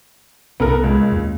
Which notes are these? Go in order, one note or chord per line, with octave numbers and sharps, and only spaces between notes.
C2 C3 B3 A4 A#4
C#2
D#2 A#3 C#4